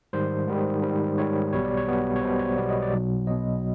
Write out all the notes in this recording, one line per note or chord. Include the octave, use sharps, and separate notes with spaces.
G#2 D#3 G3 C5
G#2 D#3 G3
G#2 D#3 G3
G#2 D#3 G3 C#5
B1 B2 G3 B3 C#5
D5
C#5
B1 B2 G3 B3
C#5
B1 B2 G3 B3 C5
C#5
B1 B2 G3 B3 D5
D#5
D5
B1 B2 F#3
B1 B2 F#3 D#5